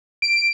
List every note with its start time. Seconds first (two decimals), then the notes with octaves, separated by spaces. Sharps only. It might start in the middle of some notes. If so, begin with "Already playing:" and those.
0.22 D7